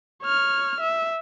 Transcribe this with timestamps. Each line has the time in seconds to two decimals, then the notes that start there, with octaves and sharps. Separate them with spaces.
0.23 C#5 F6
0.80 E5